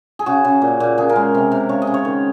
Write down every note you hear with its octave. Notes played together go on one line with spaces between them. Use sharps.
G#4
C#3 F#4
C#3
A#2
A#2
C#3 G#4
A#4
G#3
C3
C3
C#3 C#5
D#5
C#3
C#5
D#3